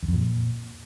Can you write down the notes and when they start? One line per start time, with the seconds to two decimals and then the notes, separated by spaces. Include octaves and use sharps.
0.03 E2
0.08 F2
0.14 A#2